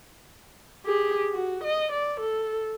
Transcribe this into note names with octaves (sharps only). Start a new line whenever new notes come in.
G4 G#4
F#4
D#5
D5
A4